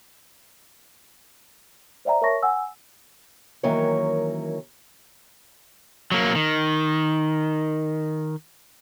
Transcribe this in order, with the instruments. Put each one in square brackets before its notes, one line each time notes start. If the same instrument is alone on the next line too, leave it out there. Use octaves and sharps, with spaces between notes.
[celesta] C5 D5 E5 G5 A#5
A#4 C#5 E5 A5 C#6 A#6
F#5 G#5 E6
[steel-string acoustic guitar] D#3 E3 F#3 A#3 C#4 C#5
[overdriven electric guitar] F#3 A#3
D#3